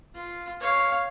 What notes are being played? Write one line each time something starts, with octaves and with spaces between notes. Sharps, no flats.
F4
C#5 F5